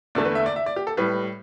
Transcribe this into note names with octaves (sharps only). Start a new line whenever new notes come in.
E2 D3 A3 D5
B4
E5
D5
E5
D5
G4
A4
A2 G3 B4